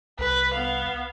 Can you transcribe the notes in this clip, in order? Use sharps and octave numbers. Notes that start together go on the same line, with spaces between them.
C2 B4
B3 F5